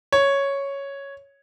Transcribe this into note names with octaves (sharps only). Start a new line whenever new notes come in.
C#5